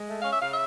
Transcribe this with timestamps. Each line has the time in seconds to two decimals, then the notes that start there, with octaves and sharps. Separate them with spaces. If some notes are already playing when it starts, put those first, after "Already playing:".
Already playing: G#3
0.08 A3
0.20 C#4 F5
0.31 E5
0.41 C#3 F5
0.51 E5